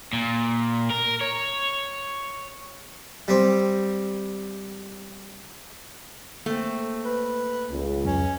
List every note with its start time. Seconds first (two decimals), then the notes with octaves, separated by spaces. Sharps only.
0.13 A#2
0.90 A#4
1.21 C#5
3.28 G3 C4
6.46 A3 A#3 C4
7.05 B4
7.69 C#2
8.05 F2 F#3 C#4